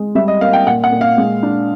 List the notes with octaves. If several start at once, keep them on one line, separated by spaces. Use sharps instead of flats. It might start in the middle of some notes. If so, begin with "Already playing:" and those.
Already playing: G#3
G3 E5
D#5
A#3 F5
G5
A#2 F#5
F#5
A#2
F5
G#3
D4